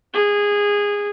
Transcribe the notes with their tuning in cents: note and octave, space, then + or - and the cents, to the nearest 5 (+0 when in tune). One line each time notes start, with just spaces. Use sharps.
G#4 -15